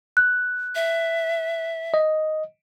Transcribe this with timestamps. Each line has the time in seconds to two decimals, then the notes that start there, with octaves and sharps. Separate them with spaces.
0.17 F#6
0.75 E5
1.94 D#5